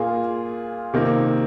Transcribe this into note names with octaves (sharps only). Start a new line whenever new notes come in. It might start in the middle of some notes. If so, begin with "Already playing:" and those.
Already playing: A#2 A#3 F4 G#4
C3 D#3 A#3